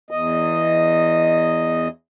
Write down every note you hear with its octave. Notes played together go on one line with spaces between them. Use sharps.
E2 D#5